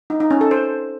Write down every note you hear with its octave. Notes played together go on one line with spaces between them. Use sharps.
D#4
D#4
C#4
A4
C5